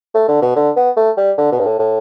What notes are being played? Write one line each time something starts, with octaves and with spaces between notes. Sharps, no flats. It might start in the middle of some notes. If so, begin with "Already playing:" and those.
A3
D3
B2
D3
B3
A3
G3
D3
B2
G2
A2
A2